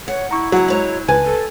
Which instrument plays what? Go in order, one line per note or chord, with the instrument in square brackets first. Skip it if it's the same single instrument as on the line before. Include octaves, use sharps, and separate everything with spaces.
[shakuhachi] C#5 [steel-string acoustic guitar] F#5
[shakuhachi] E4 [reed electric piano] A#5 C#6
[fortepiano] F#3 [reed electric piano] F#4 [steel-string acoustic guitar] F#5 A#5
[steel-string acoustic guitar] G#3 C#5 A#5
[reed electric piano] C#2 [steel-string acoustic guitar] B4 A5 [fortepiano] G#5
[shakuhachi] A4